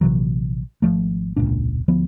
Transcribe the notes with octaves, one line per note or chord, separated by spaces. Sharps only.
A#1 C3 E3 F#3
G#1 D2 F3 A3
E1 C#2 A#2 D4
D2 F3 B3